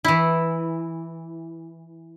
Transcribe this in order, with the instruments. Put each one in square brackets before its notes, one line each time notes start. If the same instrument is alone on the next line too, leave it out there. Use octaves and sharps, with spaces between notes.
[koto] E3 E4